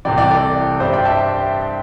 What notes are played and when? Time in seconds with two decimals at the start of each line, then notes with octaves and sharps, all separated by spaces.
0.05 C2 C3 E3 D5 G5
0.18 D5 G5
0.31 A4 D5
0.80 G2 G3 C5 E5
0.93 D5 G5
1.05 E5 A5